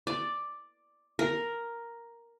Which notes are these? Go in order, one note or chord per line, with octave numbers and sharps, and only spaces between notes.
D5
A#4